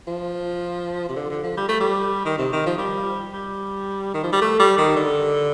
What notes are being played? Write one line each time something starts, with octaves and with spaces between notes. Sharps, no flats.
F3
C3
D3
D3
F3
G3
A3
G3
D#3
C3
D#3
F3
G3
G3
D#3
F3
G3
A3
G3
D#3
D3